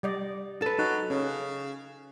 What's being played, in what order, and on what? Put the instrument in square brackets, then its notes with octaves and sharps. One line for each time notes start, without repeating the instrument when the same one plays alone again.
[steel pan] G3 D5 D#5
[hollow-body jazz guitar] A4 B4
[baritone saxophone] F#3 [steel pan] D#4
[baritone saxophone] C#3 [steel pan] C#4